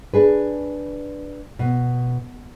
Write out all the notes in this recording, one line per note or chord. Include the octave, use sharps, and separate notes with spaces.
D4 G#4 B4
B2